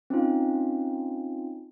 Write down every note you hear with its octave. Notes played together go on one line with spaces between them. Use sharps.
C4 C#4 D#4 F4